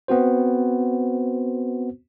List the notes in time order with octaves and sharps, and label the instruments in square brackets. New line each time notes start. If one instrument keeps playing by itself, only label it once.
[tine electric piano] B3 C4 F#4 C5